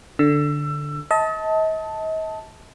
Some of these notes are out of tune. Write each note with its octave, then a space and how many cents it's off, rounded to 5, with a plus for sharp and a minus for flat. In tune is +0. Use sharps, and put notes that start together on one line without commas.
D3 +0 E6 +25
D#5 +40 A5 +0